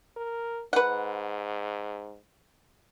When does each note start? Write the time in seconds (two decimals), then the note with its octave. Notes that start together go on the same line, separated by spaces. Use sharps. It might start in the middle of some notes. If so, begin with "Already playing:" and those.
0.17 A#4
0.73 G#2 B4 F#5